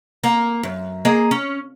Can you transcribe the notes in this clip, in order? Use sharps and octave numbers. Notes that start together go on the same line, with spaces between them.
A#3
F#2
A#3 G#4 D#5
C#4